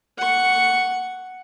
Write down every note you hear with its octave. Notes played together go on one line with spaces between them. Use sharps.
F#5 C#6